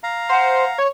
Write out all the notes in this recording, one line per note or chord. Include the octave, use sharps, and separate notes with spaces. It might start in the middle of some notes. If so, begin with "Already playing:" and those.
F5 A#5
C5 F#5
C#5